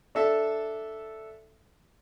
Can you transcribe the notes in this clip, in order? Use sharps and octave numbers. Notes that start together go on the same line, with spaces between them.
D4 A4 E5